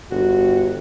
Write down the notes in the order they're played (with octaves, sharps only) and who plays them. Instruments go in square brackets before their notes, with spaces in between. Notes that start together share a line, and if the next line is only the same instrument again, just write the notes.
[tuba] G1 [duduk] F#4